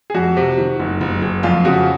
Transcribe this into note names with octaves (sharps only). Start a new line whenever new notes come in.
G#4
F2 F#4
C3
D#3
F#1
F#1
F#1
F2 F4
C#3 F#4